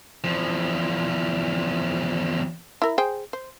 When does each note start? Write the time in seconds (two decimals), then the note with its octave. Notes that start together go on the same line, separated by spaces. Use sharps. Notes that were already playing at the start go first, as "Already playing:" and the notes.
0.24 E2 F3
2.82 E4 A#4
2.98 G#4 C5 G5
3.33 C5